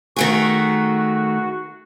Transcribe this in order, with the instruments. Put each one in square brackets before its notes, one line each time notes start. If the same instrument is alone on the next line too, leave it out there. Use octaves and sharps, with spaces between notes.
[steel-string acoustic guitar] D#3 A3 G#4 [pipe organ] F#4